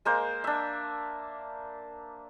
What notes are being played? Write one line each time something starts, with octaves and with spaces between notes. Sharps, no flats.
G#3 A#3 C5
D4 E5